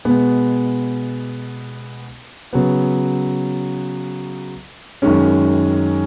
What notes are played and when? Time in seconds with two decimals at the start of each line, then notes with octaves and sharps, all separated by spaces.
0.05 B2 G#3 B3
2.53 C#3 F#3 B3
5.02 F#2 D#3 G#3 C#4